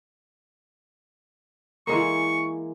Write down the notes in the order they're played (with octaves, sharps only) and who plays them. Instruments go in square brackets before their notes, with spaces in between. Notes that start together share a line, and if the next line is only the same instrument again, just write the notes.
[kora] E3 G#3 A#3 [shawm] C#6